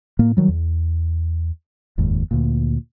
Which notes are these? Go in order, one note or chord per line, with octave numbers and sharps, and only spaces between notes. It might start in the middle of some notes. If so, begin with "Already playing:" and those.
A2 A#3
D#3 F#3 G3
E2
F1 D#2 G#2
D2 A#2